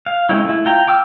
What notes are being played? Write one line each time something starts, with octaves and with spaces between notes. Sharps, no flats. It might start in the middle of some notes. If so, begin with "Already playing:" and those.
F5
G#3 C4 C#4 D#4 E4
A3 E4
F4 G5 A#5
G5 D6 E6 F6